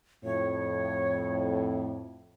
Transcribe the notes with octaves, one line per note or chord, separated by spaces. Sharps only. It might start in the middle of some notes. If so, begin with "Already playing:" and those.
F2 A2 C#5